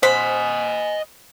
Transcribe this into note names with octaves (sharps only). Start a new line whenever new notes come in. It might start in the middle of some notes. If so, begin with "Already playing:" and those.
C5 D#5 F#5 G#5 B5